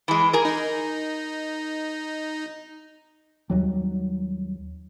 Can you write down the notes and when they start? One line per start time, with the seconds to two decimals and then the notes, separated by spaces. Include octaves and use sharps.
0.08 E3 G#3
0.33 G#4 A#4
0.45 D#4
3.50 D#2 F#3 G3